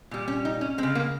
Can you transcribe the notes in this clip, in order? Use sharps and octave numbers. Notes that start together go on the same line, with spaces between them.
A#2 G3
C#4
D#4
C#4
G#3 C4
C#3
A#3